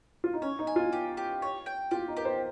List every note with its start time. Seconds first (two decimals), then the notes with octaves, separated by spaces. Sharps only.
0.24 F4
0.34 D#4
0.42 C#4 C#5
0.59 D#4
0.67 G#5
0.76 F4
0.93 G4
1.17 G4
1.42 C#5
1.66 G5
1.91 F4 G4
2.08 D#4
2.17 G4 A#4
2.25 C5